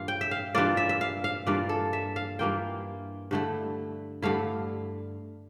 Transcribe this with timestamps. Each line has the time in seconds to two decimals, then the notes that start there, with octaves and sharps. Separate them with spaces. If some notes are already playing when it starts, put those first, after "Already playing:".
Already playing: G2 E3 A#3 F4 F5
0.08 G5
0.21 E5
0.31 F5
0.55 G2 E3 A#3 F4 D5
0.77 E5
0.89 E5
1.01 F5
1.24 F5
1.47 G2 E3 A#3 F4 D5
1.69 A4
1.93 E5
2.16 F5
2.39 G2 E3 A#3 F4 G5
3.31 G2 D3 A3 E4
4.22 G2 D3 A3 E4 F5